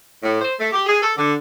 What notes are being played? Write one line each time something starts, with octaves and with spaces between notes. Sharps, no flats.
A2
C5
A3
G4
G#4
A4
D3